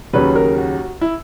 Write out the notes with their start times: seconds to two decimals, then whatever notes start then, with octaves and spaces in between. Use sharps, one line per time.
0.13 D#2 C#3 F#3 C#4 B4
0.36 A#4
0.58 F#4
1.01 E4